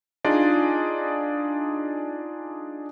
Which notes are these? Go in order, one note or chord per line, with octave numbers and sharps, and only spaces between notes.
D4 D#4 F4 G#4 D5 D#5